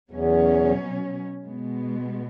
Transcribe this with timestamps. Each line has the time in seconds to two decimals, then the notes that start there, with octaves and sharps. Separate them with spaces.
0.11 E2 B2 F#3 C#4
1.46 B2 G#3 B3